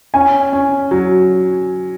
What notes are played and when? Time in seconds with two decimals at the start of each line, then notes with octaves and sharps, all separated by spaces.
0.14 C#4 G#5
0.53 C#4
0.91 F#3